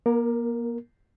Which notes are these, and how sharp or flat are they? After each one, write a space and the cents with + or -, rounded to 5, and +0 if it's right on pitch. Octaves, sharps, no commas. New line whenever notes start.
A#3 +35 A#4 +0